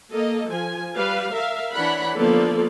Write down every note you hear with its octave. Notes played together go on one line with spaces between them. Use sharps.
A#3 A4 D#5
F3 G#5
G3 B4 F5
A#4 E5 F5
E3 D4 C#5 F#5 B5
D3 F3 A#3 B3 A4 D5